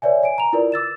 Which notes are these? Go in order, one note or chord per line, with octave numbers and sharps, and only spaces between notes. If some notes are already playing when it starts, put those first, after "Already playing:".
B4 C#5 D5 E5 G#5
G#5 D7
A#5 F7
E4 F4 A#4 B4 D5
D6 E6 A6 E7